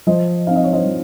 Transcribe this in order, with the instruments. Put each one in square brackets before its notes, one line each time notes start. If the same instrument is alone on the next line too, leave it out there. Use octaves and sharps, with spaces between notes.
[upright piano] F3 C5 D#5
C4 D#4 F5
D#5
C#5
C5 D#5
F3